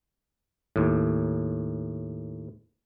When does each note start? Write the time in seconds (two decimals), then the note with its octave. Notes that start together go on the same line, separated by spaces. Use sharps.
0.76 D#2 A2